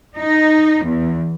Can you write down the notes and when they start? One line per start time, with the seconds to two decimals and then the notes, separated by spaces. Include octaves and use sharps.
0.18 D#4
0.85 E2